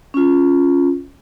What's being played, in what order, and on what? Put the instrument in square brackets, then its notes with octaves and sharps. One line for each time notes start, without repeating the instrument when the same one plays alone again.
[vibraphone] C#4 F4